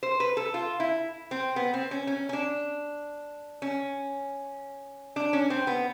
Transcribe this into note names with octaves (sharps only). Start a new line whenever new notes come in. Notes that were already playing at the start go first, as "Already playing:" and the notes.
C5
B4
A4
F4
E4
C4
B3
C4
C#4
C#4
C#4
D4
C#4
D4
C#4
C4
B3